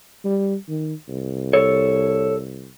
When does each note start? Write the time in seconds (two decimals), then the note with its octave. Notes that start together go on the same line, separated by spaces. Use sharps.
0.24 G3
0.69 D#3
1.08 C2
1.53 A4 C#5